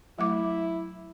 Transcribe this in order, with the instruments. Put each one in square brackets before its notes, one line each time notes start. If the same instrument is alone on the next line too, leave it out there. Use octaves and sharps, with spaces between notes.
[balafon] F#3 A3 D6 [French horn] E4